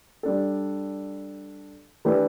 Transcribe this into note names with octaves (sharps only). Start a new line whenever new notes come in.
G3 D4 A4
E3 A3 D4 G4 B4